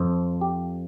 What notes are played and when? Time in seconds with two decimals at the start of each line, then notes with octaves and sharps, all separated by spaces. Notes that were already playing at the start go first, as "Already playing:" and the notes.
Already playing: F2 F3 C5
0.41 G4